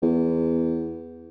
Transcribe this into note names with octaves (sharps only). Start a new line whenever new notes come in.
E2